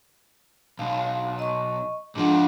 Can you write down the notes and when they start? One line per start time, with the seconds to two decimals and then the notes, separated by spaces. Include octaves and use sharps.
0.79 B1 F5
1.39 D#5 C#6
2.15 G#2 F3 D4 F#5